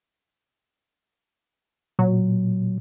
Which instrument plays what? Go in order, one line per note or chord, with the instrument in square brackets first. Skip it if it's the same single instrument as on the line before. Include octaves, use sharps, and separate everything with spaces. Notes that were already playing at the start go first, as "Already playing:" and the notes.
[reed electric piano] A#2 [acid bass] F#3